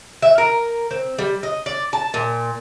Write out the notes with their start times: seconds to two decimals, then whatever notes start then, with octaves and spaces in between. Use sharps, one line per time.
0.22 E5
0.38 A#4
0.91 C4
1.18 G3
1.43 D#5
1.66 D5
1.93 A5
2.14 A#2